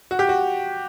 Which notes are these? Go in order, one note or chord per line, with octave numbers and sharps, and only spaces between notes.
F#4
G4
F#4